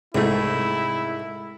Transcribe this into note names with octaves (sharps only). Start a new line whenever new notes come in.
C2 G#2 A3 E4